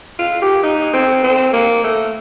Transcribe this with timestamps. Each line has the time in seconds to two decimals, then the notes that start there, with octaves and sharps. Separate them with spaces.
0.19 F4
0.42 G4
0.63 D#4
0.94 C4
1.23 C4
1.53 A#3
1.84 A3